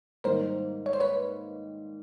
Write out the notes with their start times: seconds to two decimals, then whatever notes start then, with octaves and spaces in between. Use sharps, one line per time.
0.24 G#2 D#3 G3 A#3 A#4 C5
0.86 C#5
0.93 C5
1.00 B4 C#5